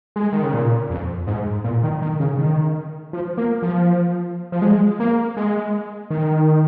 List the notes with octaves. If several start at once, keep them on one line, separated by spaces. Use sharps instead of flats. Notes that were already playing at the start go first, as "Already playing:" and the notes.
G#3
D#3
C#3
A#2
F2
G#2
A#2
D#3
D#3
C#3
D#3
F3
A#3
F3
F3
G#3
A#3
G#3
D#3